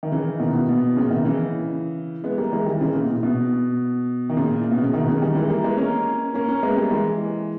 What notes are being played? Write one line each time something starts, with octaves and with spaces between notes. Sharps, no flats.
D#3
C#3 E3
B2 D#3
B2
B2
A#2 C#3
B2 D#3
C#3 E3
G#3 B3
G3 A#3
E3 G#3
D#3 G3
C#3 E3
A#2 C#3
B2
B2
D#3
A#2 C#3
A#2
B2
C#3
B2 D#3
C#3 E3
D#3 G3
E3 G#3
G3 A#3
G#3 B3
A#3 C#4
A#3 C#4
A#3 C#4
G#3 B3
G3 A#3
E3 G#3